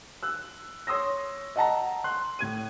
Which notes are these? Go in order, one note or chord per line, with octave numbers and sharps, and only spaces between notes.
E6 F#6
C#5 C6 D#6 E6 A#6
D#5 F#5 A5 A#5
C6 F#6
A2 G#6 D#7